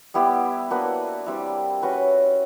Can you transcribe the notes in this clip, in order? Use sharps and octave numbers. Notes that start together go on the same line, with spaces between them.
G3 B3 E4 G4
A#3 D4 F#4 B4
G3 C4 E4
C#4 F#4 B4